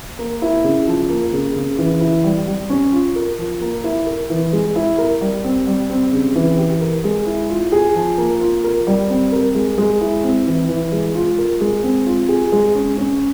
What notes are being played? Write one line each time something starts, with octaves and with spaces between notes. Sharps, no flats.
A#3
E4
C#3
F3
A#3
C#3
C#3
E3
E4
G3
G3
C#4
F4
A#4
F3
A#3
E4
A#4
E3
G#3
E4
A#4
G3
C4
G3
C4
C#3
E3
G4
A#4
G#3
E4
F4
G#4
F3
A#3
F4
A#4
G3
C4
A#4
G#3
G#3
E4
C4
E3
E3
G#3
F4
A#4
G#3
C4
F4
G#4
G#3
C#4
C#4